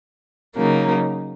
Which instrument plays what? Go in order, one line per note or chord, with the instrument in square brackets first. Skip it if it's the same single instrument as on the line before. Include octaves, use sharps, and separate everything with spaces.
[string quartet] C#3 F#3 A#3 D#4